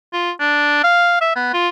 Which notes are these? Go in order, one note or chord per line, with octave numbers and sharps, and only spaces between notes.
F4
D4
F5
E5
B3
F4